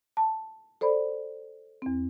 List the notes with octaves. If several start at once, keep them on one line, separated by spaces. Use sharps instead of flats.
A5
A4 C5 D5 B5
E2 C4